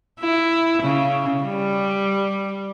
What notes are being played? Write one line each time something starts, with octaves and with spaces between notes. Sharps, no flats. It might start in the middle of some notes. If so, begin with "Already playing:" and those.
E4
C#3
G3